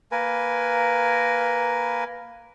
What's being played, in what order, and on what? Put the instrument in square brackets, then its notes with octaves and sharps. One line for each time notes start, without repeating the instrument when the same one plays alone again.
[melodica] A#3 A#4 B4 G#5